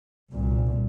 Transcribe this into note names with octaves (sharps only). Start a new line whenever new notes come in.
C2 A#2